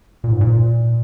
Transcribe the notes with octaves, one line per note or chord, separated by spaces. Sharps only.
A#2
G#2
A#2